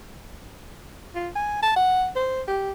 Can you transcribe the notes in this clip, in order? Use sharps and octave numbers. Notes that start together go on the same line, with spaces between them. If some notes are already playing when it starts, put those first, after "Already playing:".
F4
G#5
A5
F#5
C5
G4